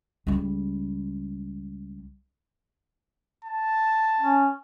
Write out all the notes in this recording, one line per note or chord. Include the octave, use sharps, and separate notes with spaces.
C#2 G3
A5
C#4